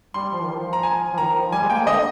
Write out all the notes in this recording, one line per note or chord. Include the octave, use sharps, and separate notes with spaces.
G3 C6
F3
D#3
F3
A#5
G#5
F3
D#3 A#5
F3
G3 G#5
G#3
A#3 G5
G#3
D3 D#5